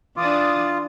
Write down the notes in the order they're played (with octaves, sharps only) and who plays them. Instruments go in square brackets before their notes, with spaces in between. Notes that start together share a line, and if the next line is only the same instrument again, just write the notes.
[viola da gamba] E3 D4 [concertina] F4 [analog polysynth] D6 D#6 A6